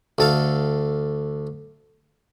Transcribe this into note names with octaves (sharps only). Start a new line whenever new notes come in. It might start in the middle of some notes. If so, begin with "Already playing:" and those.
D2 A4 F5